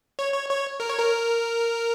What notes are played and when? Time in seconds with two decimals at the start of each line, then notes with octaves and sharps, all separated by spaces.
0.19 C#5
0.34 C#5
0.49 C#5
0.80 A#4
0.89 C#5
0.99 A#4